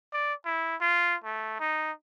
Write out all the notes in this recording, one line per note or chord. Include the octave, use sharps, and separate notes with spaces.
D5
E4
F4
A3
D#4